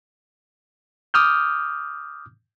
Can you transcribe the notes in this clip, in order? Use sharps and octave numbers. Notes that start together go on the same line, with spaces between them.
D6 D#6 F6 G6